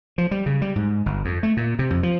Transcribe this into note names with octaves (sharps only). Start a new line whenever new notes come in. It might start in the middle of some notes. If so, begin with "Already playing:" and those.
F3
G3
C#3
G3
G#2
G1
F2
A3
A#2
C3
F2
F3